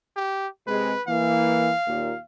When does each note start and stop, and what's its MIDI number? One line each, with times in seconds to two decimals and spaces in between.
0.16 0.47 67
0.67 0.92 48
0.67 0.92 56
0.67 1.03 71
1.08 1.70 52
1.08 1.70 58
1.08 2.22 77
1.87 2.13 39
1.87 2.13 46